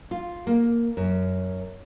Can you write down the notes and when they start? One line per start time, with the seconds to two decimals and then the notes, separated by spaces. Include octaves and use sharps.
0.11 F4
0.47 A#3
0.97 F#2